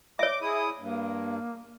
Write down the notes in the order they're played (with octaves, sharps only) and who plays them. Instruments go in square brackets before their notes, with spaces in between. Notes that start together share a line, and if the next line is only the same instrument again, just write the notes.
[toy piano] C#5 E5 [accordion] D6
[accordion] E4 D#6 [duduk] G#4
[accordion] G2 [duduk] A#3